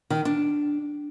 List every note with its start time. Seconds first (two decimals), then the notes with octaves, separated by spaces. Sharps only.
0.10 D#3
0.25 D4